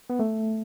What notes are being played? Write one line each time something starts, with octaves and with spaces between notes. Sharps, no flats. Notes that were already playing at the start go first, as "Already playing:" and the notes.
B3
A3